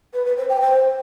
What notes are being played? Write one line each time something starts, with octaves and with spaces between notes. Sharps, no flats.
B4
B4
C5
G5
C5